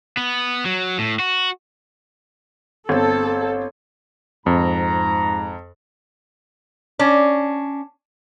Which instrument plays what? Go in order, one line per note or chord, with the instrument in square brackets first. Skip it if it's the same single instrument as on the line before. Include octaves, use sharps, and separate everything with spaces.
[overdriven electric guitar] B3
F#3
A2
F#4
[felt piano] G1 C4 [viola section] A4
[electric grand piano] F2 [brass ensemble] G#2 A#5
[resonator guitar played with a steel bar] C#4 D4